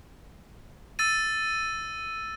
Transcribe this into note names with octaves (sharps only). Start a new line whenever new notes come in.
E6 A6 D#7